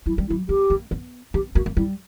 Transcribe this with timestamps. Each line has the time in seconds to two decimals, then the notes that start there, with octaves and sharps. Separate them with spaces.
0.06 F#3 E4
0.18 G3
0.28 E4
0.30 F#3
0.49 A#3 G4
0.70 A#3
0.91 B3
1.34 B3 G4
1.55 A#3 F#4
1.66 A#3
1.76 G3 E4